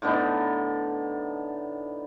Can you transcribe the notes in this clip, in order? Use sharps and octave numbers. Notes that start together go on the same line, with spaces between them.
A2 D3 B3 D#4